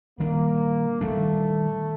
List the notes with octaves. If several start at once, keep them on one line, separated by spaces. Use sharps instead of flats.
D#3 G3 A#3 D4
D#3 G3 A3 D4